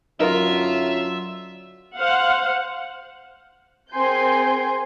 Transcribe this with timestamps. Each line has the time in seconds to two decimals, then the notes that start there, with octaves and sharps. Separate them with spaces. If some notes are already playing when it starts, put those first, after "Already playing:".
0.20 F#2 D3 F#3 D#4 F4 A#4 E5
1.97 C5 F5 F#5
3.92 C4 G#4 A#4 G#5 C6 G6